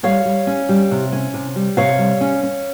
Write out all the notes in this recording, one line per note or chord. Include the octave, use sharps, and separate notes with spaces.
G3 C#5 F5
G3
C#4
G3
C3
C#4
C3
G3
C3 C#5 F5
G3
C#4
C#4